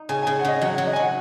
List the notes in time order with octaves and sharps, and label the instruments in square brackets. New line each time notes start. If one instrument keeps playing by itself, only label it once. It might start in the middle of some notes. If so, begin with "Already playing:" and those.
Already playing: [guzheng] D#4
[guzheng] C#3 [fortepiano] G#5
[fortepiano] G#5
[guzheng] C#3
[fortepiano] F#5
[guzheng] C#3 [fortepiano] D#5
[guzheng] F#3 [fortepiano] F#5
[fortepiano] F#5
[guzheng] F#3
[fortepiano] D#5
G#5
[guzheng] F#4 [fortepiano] F#5